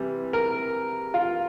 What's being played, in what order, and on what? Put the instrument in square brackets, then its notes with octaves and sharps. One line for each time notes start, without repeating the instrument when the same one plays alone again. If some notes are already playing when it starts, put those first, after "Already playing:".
Already playing: [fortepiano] C3 E3 G3
A#4
F4